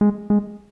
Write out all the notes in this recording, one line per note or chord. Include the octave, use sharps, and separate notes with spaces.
G#3
G#3